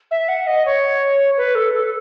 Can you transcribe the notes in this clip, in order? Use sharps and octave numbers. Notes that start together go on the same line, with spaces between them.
E5
F#5
D#5
C#5
B4
A4
A4